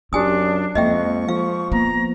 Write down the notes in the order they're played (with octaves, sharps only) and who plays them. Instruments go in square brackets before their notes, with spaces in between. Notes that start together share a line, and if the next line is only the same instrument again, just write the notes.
[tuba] F#2 [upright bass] C4 [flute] D4 [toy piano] G4 G#5 D#6
[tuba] F2 [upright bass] G#3 A#3 [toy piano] D#5 E5 G5 [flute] C#6
[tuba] F3 [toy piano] F5
[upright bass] A#3 B3 [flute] A#5